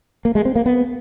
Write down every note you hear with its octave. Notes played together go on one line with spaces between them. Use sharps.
A#3
G#3
C4
A#3
B3